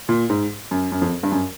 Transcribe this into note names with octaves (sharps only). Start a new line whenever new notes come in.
A#2
G#2
F#2
F#2
F2
G2
F#2